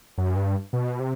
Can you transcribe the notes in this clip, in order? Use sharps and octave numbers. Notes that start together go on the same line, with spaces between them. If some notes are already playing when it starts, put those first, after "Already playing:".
F#2
G2
B2
C3